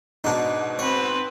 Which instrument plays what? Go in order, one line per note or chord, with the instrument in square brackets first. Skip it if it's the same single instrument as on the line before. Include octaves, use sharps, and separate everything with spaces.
[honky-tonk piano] G#2 B2 [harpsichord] D4 D#4
[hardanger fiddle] C4 B4 [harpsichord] C#5